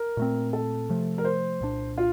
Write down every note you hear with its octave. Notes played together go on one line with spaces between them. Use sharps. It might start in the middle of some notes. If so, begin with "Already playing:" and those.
Already playing: A#4
A#2 A3 C4
A4
C3 F3 A3
A#4
C5
C2 A#2 G3 D4
F4